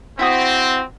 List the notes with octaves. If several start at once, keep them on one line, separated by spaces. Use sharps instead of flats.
C4 E4 F#4 D#6